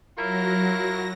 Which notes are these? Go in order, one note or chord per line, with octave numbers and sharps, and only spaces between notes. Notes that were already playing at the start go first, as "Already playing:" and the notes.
F#3 E4 F4 A#4 A#6